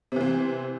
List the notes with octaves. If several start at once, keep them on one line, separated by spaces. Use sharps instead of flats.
C3 E3 C4